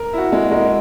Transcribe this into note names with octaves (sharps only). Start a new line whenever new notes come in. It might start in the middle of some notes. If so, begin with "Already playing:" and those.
Already playing: A#4
E4
F#4
G#3
A#3
G#3